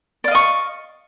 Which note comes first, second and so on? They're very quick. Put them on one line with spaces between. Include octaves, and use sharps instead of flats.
D5 F5 D#5 C#6